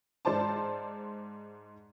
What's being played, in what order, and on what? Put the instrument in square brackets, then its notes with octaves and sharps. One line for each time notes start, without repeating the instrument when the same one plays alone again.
[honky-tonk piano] G#2 C5 D5 A5